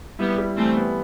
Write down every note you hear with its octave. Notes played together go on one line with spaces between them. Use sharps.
G3 B3 E4
G3
E3 A3 C4
B3